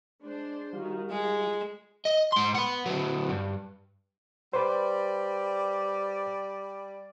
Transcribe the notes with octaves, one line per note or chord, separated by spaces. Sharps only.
G#3 D4 C5
D#3 G3 F4 F#4
G#3 G#4
D#5
G#2 C6
B4 F#5
D3 F#3
G2
G3 B4 C5 D5